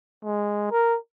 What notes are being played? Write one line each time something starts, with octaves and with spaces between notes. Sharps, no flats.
G#3
A#4